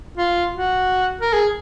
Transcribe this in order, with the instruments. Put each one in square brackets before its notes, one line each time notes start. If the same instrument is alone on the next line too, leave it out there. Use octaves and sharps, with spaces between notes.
[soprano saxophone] F4
F#4
A#4
G#4